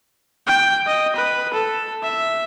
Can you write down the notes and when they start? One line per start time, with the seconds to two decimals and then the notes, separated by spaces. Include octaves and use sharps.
0.47 G5
0.87 D#5
1.16 B4
1.54 A4
2.03 E5